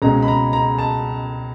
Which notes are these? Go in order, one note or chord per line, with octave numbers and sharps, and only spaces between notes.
C#2 B2 G#3 C4 A#5
B5
A#5
A#5
A5